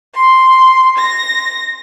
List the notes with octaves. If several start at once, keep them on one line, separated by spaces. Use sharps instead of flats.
C6
A#6